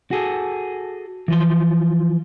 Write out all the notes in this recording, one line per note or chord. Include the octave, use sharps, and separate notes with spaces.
F#4 G#4 A4
E3 F3 C6